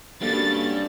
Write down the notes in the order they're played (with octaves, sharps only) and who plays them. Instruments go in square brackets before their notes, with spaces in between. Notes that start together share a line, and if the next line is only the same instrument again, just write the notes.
[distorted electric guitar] G2 [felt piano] G3 A#3 A4 [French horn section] C4 C#4 F#4 [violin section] A6